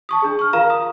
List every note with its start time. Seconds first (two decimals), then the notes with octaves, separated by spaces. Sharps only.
0.09 A5 C#6 D#6
0.22 D4 G#4
0.39 C#6 F6
0.53 F4 A#4 F5 A#5 E7
0.70 D#6